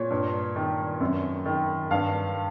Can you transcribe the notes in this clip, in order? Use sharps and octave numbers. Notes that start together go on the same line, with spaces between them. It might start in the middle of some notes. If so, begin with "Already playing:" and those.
Already playing: A#2 C#5
G2
D#3
F#2
D#3
G2 F5